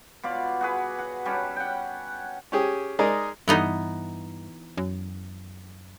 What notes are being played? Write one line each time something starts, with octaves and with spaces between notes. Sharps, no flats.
B2 F4 D5
F#4 G#4 B4
F#5
G3 C#4 D4
F#5 G5
C#4 G4 G#4
G#3 D#4 G#4 A#4 D5
G2 E3 B3 D#4
F#2